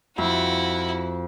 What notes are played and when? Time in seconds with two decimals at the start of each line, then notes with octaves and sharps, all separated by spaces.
0.18 F2 E4 F#4